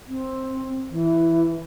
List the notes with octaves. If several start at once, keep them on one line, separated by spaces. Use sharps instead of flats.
C4
E3